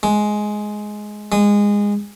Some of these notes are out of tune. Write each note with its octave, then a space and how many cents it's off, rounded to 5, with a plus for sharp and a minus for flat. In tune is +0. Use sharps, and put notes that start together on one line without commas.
G#3 +10
G#3 -20